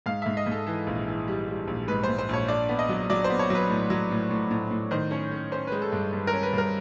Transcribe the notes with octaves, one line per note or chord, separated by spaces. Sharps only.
G#2 F5
G#2 E5
D#5
G#2 A4
E3 A4
A#1
E3
G3
G3
A#1
G#2 B4
G#2 C5
C5
A#1 C#5
D4 D5
B3
D#5
F#3
F#3 D5
C5
B3
C#5
F#3 B4
A2
F#3
A2
A2
A2
A2
D#3 C5
C#4 C#5
C#4
C#4 C5
G#3 B4
A4
G2
G2
A#4
C#4
B4
G2 A#4